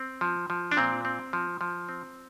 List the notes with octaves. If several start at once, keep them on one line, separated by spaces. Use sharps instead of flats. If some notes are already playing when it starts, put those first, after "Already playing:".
Already playing: C4
F3
F3
D4
A#2 C4
C4
F3
F3
C4